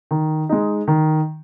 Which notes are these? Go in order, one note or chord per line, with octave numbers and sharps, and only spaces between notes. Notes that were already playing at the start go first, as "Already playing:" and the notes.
D#3
G#3 D#4
D#3